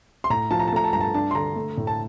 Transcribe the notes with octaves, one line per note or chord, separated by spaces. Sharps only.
C6
A2 A#5
F3 A5
A#5
A5
A3 A#5
A5
G2 A#5
A5
D4 A5
C6
D3 A#5
A3
A2
A5